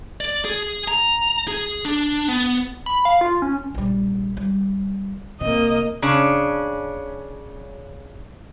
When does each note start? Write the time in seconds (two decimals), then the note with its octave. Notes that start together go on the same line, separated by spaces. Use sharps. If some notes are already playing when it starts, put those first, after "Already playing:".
0.21 D5
0.45 G#4
0.88 A#5
1.48 G#4
1.85 D4
2.28 B3
2.86 B5
3.05 F5
3.21 F4
3.42 C#4
3.74 A#1 G3
4.37 G3
5.41 C2 C3 A#3 D#5
6.02 C#3 C#4 D4